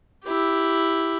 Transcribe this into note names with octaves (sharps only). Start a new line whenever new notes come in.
E4 G4